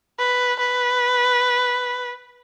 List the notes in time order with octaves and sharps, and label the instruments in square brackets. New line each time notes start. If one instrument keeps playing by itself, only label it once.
[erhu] B4
B4